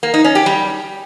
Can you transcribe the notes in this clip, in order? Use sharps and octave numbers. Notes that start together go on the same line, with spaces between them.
A#3
D#4
C#4
G4
G3